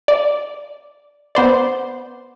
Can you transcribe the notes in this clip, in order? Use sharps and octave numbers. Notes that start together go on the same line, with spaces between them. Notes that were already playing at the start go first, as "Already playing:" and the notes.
D5
B3 C5 D5